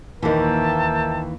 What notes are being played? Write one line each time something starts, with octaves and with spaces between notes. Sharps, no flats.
D#2 A#2 D#3 E3 A#4 E5 G5 A5